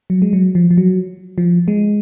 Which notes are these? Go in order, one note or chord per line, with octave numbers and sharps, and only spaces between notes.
F#3
G#3
F#3
F3
F3
F#3
F3
G#3